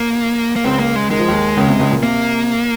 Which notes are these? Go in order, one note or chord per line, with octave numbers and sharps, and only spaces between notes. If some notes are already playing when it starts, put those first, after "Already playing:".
Already playing: A#3
A#3
C#2 C#3 C4
A#3
G#3
D#3 G#3
F3
D#2 D#3
C#2 C#3
C3
C#2 C#3
A#2
C3 A#3